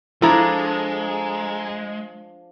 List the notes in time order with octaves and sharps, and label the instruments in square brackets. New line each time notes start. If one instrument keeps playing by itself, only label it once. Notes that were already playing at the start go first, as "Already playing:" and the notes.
[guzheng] F3 D4 G#4 [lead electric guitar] G#3 [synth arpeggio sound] E4 [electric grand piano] A4 A#5